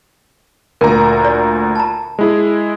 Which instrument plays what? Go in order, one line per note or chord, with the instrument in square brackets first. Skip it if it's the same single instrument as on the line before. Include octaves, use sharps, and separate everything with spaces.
[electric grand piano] D2 A#2 A#5 [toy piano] A#4
[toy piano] D5
A5 A#5
[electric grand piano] G#3 E4 G#4